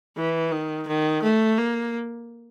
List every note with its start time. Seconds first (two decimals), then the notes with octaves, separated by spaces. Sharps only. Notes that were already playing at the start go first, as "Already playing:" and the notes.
0.17 E3
0.52 D#3
0.87 D#3
1.23 A3
1.58 A#3